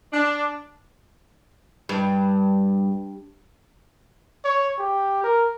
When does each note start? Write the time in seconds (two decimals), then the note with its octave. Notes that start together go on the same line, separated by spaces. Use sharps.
0.13 D4
1.89 G2
4.44 C#5
4.78 G4
5.24 A#4